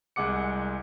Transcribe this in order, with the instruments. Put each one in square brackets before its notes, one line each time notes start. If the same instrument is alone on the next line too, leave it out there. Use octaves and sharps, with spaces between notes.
[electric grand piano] C2 G#3 F#5 D6 C#7